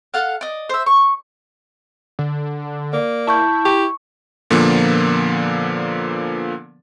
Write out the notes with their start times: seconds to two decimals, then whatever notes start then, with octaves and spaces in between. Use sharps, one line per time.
0.14 A4 F5 F#5
0.41 D5 D#5
0.69 C5 E5
0.86 C#6
2.19 D3
2.93 A#3 D5
3.27 E4 A5 C#6 G6
3.65 G4 C#6
4.50 A#2 D3 F3 A#3 B3